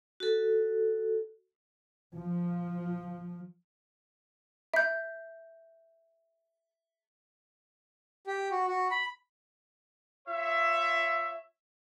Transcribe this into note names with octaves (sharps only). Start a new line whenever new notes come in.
F#4 A4
F3
E5 G6
G4
F#4
F#4
B5
F4 C#5 E5